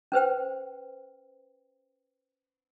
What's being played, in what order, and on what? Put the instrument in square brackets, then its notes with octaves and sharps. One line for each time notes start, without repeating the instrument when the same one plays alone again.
[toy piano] C#4 B4 C5 G5